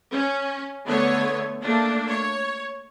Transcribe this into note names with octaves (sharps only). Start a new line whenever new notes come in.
C#4
D3 A3 B3 C#5
A3 A#3 D4
C#5